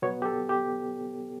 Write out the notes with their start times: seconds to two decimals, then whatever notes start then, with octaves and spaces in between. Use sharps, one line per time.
0.02 B2 F#3 B3 C#5
0.22 G4
0.25 A4
0.49 G4